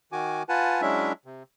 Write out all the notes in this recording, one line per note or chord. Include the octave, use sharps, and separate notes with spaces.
D#3 F#4 G#5 D6
F4 B4 F#5 G#5 A5
F#3 G#3 C#4 D4 E4 E5
C3